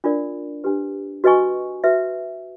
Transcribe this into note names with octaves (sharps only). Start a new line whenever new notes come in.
D4 F4 A#4 D5
D4 G4 B4
F#4 B4 D#5 G#5 C#6
F#4 B4 E5